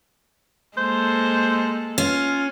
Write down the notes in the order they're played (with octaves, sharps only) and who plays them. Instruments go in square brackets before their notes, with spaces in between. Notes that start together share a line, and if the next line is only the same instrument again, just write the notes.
[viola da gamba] G#3 A#3 A4 [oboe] C5
[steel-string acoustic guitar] C#4 [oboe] F4